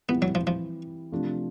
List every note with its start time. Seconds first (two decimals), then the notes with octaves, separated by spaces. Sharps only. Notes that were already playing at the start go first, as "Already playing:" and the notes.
0.09 E3 G3 B3 C4 E4
0.22 F#3
0.35 F3
0.47 F3
1.12 C3 F3 A3 D4